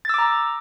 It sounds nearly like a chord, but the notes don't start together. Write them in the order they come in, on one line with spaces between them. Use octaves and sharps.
A6 E6 D6 A#5